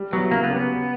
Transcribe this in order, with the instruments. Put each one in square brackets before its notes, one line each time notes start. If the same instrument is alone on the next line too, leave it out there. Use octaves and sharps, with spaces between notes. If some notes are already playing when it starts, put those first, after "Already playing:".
Already playing: [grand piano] G3
[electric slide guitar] F#3 [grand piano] B3 E4
[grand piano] C#3 [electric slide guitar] A#3
[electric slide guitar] B3
[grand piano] F#3 C#4 G4
[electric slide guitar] B3
[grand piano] C#3